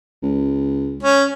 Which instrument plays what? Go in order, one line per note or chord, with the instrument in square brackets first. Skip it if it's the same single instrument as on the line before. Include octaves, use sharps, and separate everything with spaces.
[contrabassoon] C#2
[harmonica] C#4